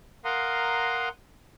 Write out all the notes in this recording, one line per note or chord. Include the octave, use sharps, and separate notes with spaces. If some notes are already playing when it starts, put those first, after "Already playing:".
A#4 F5 F#5 A#5 C6 D#6